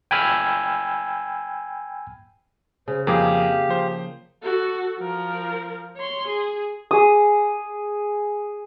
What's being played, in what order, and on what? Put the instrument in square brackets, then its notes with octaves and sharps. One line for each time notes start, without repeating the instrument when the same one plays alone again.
[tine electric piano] G5 G#5 B5 E6 F6
[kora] C#3 [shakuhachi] C5
[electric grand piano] F2 F3 D6 [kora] A#3 G#4 [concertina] G4 [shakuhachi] F5
[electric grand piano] F3 C5
[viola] F#4 A4
F3 A#4
C#5 C6
G#4
[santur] G#4 D#6